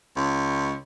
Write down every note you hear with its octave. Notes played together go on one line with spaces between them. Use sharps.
C#2